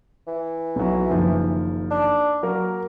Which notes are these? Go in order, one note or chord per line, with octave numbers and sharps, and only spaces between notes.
E3
B1 F#3
F#1 D#3 F3
D4
F#3 A#3 A#4